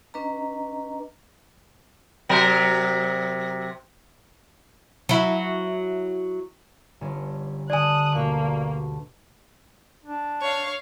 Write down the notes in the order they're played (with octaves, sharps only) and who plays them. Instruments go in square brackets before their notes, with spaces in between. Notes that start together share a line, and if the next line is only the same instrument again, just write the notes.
[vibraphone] C#4 D4 B4 D#5 A#5
[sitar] C3 F#3 A#4
[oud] F#3 E4
[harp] G1 C#4
[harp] D3 D4 [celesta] D5 G#5 [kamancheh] D#6 F#6
[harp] D2 B2 C#6 [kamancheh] A#3
[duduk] D4
[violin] C#5 F5